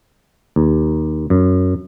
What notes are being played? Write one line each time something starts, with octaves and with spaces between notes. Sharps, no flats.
D#2
F#2